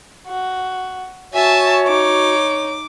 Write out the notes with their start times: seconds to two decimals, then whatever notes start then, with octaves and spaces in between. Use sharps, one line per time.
0.27 F#4
1.34 F#4 C#5 E5 G#5 A5
1.88 D#4 D6